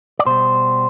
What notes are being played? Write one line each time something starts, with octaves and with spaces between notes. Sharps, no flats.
D5
B2 G3 C5